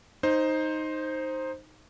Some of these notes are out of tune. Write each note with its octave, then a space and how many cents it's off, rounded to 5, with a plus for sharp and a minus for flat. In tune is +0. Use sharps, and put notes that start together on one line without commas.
D#4 +0 C5 +10